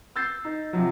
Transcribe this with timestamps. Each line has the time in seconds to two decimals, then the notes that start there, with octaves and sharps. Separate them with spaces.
0.16 E6 G6 A6 C7
0.45 D#4
0.73 C3 F3 F#3